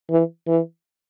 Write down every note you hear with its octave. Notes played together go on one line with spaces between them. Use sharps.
E3
E3